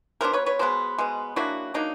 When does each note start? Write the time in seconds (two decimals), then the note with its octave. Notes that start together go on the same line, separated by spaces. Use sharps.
0.21 F#3 B3 D4 A#4 C5
0.33 B4 C#5
0.46 B4 C#5
0.59 B2 G#3 B3 C5
0.98 B2 G#3 B3
1.36 F#3 A#3 D4 E4 F#4
1.74 F#3 A#3 D4 D#4